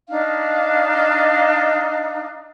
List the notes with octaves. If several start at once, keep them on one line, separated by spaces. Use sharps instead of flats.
D4 D#4 F5